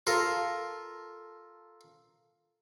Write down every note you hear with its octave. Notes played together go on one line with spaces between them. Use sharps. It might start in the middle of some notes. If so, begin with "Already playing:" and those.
F4 A4 A#4